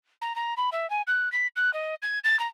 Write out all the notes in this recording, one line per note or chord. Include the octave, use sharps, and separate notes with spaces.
A#5
A#5
B5
E5
G#5
F#6
B6
F#6
D#5
G#6
A6
A#5